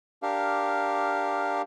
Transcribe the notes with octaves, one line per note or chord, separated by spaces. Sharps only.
D4 G4 A#4 F5